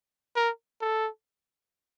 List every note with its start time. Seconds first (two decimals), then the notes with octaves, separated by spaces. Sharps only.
0.36 A#4
0.81 A4